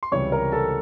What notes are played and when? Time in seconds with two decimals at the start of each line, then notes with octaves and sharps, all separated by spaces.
0.03 C6
0.11 C#2 C3 E3 G3 C#5 C#6
0.32 A#4 A#5
0.52 A4 A5